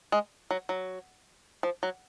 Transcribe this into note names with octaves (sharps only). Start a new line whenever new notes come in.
G#3
F#3
F#3
F3
F#3